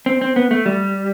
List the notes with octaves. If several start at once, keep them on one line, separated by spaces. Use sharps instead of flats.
C4
C4
B3
A3
G3